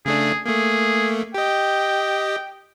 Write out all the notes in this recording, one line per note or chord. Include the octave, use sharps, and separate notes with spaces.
C#3 A3 D4 G#4
A3 A#3 G#4
G4 D#5 G5